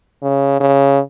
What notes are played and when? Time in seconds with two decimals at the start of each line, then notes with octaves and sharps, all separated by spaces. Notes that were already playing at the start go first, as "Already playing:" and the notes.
0.23 C#3
0.60 C#3